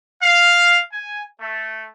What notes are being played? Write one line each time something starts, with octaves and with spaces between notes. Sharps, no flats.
F5
G#5
A3